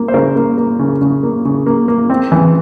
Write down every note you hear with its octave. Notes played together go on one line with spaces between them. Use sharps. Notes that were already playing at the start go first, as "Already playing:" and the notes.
Already playing: A#3
C5
C#3 A#4
A#3
A#3
C#3
C#3
A#3
C#3
A#3
A#3
C4
E3